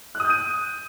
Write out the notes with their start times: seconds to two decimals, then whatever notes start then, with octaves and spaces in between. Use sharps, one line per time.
0.15 F#6
0.20 D#6
0.25 G6
0.30 D#7